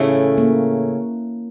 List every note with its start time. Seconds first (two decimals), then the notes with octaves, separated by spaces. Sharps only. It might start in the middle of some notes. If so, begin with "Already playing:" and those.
Already playing: A2 C#3 E3 A3 C#4 E4
0.38 A#3